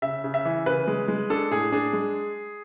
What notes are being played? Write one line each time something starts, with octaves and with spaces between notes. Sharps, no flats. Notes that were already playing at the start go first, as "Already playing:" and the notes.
C#3 E5
C#3
E5
E3
C#3 B4
G#3
G#3
D4 A4
A2 G#4
D4 G#4
G#3